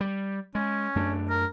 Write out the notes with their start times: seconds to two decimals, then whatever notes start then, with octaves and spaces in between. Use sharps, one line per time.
0.01 G3
0.55 G#3 C#4
0.95 F#2 A3 D4
1.30 A#4